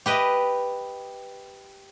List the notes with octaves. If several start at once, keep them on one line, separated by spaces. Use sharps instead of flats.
G4 B4 D#5